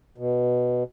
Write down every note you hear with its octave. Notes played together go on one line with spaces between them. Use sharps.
B2